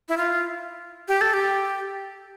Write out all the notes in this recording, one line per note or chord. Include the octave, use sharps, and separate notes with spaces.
E4
F4
G4
A4
G4